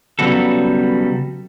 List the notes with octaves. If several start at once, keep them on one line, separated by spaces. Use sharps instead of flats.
C#3 F#3 G3 B3 F#4 A4